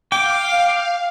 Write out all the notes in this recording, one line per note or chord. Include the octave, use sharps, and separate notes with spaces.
F5 G5 D6